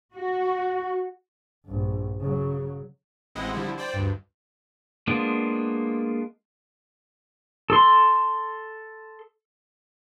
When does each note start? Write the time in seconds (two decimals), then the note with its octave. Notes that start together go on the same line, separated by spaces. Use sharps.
0.14 F#4
1.65 A#1 G2
2.20 C#3 F#3
3.35 A1 G#3 C4 E4 D#5 F#5
3.53 D3 F3 G3 E4
3.78 C5 D5 G5
3.94 D2 G2
5.07 G#3 A#3 B3 D4 F4
7.70 A4 C6